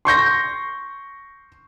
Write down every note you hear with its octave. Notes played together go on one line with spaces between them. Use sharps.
C6 C#6 G6 A#6